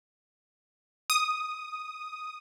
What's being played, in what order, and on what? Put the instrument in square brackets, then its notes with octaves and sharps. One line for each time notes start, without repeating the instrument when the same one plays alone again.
[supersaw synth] D#6